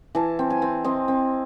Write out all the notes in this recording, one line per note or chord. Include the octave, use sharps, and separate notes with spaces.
E3 A5
C4
G#5
C4
C4 D#5
C4